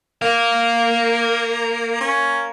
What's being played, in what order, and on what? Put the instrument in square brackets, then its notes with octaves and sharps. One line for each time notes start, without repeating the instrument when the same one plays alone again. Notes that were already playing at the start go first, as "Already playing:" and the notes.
[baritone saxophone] A#3 [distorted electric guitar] A#4 F5
[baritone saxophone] C#4